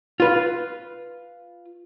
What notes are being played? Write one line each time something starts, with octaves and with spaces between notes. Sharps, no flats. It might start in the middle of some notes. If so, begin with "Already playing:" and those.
F4 B4